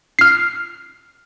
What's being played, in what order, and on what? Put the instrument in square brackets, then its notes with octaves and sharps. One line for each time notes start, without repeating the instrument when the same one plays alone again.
[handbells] F6 C7